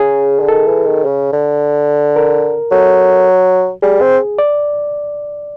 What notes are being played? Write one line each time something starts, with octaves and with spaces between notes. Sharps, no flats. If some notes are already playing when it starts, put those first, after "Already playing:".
Already playing: C#3 G#4
D3
D#3 A4
E3
D#3
C#3
D3
A#4
F#3 A4
G3 G#4
C4
D5